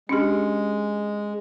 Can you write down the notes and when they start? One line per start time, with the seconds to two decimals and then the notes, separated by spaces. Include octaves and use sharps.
0.09 G#3 C#4 D4 G4